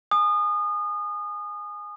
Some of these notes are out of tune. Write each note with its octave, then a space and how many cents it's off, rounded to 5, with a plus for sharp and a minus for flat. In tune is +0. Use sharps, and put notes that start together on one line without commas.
G#5 +5 D#6 -30